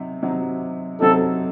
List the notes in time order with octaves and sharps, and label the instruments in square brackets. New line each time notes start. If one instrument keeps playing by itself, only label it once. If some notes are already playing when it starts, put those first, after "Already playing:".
Already playing: [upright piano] C3 F#3 D#4
C3 F#3 C4 D#4
[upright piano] C3 F#3 C4 D#4 [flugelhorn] A4